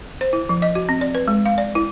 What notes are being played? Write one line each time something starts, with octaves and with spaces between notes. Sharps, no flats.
C5
E4
F3
D#5
F#4
C4
D5
B4
G#3
F5
D5
E4